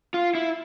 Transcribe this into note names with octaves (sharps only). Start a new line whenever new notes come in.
F4
E4